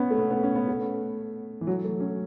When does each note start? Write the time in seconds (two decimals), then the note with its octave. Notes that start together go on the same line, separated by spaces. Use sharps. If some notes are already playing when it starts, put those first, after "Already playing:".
Already playing: B3 C#4
0.11 A3
0.18 B3
0.30 B3
0.43 C#4
0.55 B3
0.68 A3
1.61 E3
1.67 F#3
1.84 A3
2.00 C#4